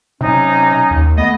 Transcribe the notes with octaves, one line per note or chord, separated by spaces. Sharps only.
C3 F#3 C#4 D#4
D#2
A3 B3 D#5